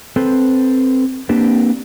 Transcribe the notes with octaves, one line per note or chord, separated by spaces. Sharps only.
C4 A4 B4 C5
A#3 C4 D4 G4 B4